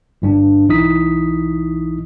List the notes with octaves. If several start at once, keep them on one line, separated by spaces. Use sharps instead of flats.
G1 G2 D4
B1 E3 D#4 E4 D#6 B6